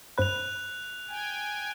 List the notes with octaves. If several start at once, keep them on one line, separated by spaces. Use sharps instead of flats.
G2 C5 B5 F#6 F7
G5 G#5